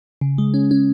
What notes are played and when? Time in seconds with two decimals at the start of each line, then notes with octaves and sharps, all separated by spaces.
0.21 C#3
0.38 G#3
0.54 C#4
0.71 C#4